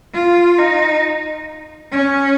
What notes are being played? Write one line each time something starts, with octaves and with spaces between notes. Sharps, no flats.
F4
D#4
C#4